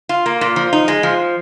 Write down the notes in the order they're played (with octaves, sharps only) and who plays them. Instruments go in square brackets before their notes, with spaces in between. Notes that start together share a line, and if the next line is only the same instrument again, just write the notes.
[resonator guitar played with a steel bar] F4
A#3
A#2
F3
D#4
G#3
F3